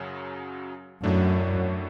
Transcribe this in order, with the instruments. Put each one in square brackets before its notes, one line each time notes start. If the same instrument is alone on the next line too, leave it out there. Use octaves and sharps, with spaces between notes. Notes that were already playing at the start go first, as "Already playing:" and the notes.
Already playing: [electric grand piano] F#2 C#3 F#3
[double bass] F#2 [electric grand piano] A2 F#3 A3 D4